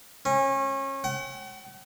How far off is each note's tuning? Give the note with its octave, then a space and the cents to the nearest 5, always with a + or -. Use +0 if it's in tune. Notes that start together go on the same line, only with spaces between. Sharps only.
C#4 -30
F#5 +45